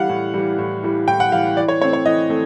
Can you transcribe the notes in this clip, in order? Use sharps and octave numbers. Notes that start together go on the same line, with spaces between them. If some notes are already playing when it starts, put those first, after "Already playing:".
Already playing: E3 G3 F5 F#5
A2
E3 G3
A2
E3 G3
A2 G5
F#5
E3 G3 F5
E3 D5
C#5
A3 C4 C#5
C#5
E3 D#5
A3 C4